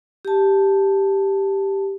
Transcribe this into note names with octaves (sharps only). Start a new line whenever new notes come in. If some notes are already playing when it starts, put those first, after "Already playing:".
G4 A5